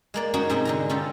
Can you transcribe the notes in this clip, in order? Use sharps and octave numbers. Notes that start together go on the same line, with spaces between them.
G#3 A#3 D5
C#4 D#4 F#4 G#4 G5
G#2 C3 G#4 G5 G#5
D3 D#4 A#5
C#4 F4 G4 A4